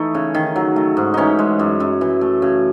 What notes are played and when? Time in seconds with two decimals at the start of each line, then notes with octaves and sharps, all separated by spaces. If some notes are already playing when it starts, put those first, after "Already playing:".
Already playing: E3 A3 D#4
0.14 C#3
0.34 D#3
0.56 F#3
0.76 A3
0.97 G#2
1.14 E3 C#4 D#4
1.39 G#3
1.59 F#2
1.80 F#2
2.01 E3
2.21 A3
2.42 C#3